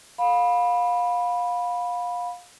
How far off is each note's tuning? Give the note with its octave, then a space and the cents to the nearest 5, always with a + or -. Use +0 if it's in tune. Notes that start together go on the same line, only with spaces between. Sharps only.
F5 +25 B5 -10